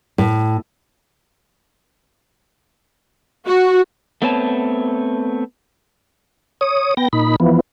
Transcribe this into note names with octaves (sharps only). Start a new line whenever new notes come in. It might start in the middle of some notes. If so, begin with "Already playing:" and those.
A2
F#4
A3 B3 C4 B4 C#5 A5
C#5 D#6
B3 G5 A#6
A#2 D#4 B5
E3 F3 B3